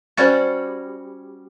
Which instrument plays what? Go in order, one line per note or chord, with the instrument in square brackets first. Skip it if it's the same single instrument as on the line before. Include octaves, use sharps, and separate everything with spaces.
[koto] G3 C#4 F#4 [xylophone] C5 D5 A6